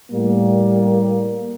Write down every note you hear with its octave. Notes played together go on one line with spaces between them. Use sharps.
A2 G3 A#3